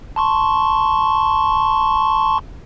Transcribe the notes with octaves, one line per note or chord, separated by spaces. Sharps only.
A5 C6 C#6